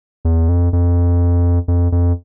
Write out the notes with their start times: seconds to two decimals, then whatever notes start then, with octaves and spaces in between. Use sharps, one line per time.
0.25 E2
0.49 F2
0.73 F2
1.68 F2
1.92 F2